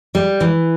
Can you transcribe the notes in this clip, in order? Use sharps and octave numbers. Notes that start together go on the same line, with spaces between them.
G3
E3